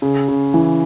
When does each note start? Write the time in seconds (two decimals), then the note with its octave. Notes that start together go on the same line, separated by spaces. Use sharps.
0.02 C#3
0.28 C#3
0.54 E3